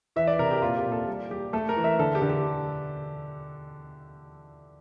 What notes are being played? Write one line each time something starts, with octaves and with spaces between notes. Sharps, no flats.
E3 E5
D5
C3 A#4
G4
A#2 F4
G4
A#2
A4
G3
G3 G4
A3 A4
A#4
E3
E5
D3 A4
G4
D3
G4